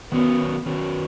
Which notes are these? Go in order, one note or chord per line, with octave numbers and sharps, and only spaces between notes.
D#3 F#3 B3 C#4 F#4 A#4
D#3 F#3 C#4 F#4 A#4